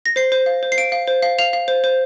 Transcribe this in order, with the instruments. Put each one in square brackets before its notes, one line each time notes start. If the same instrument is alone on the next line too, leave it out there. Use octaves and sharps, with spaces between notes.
[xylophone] A#6
C5 C7
C5
F5
C5
C7
F5 D7
F5
C5
F5
F5 F7
F5
C5
C5